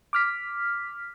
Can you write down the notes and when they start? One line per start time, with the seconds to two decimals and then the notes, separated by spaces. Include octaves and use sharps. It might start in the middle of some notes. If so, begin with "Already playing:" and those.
0.13 D6 F6 B6